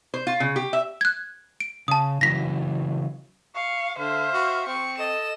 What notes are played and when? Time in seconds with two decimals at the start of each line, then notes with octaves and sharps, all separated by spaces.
0.14 C5
0.27 F4
0.40 C#3
0.56 G4
0.73 E5
1.01 F#6 G#6
1.60 D7
1.88 C#3 A5 D#6
2.21 C#3 E3 F#3 A#6 B6
3.55 F5 C#6
3.99 D3 C5 E5 F5
4.33 F#4
4.67 C4 C#6
4.99 A4 D#5 E7